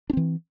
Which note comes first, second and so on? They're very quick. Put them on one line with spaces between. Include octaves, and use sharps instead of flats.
D4 C4 E3